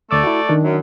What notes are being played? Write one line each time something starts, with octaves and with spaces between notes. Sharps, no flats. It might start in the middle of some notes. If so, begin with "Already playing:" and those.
D2 A3 D5 D6 E6
E4 F#4
D#3 D4
F#2